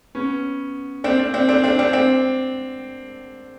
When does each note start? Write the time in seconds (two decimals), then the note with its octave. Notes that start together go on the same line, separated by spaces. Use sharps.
0.15 B3 C#4
1.04 C4 D4
1.19 C4 D4
1.34 C4 D4
1.49 C4 D4
1.64 C4 D4
1.79 C4 D4
1.93 C4 D4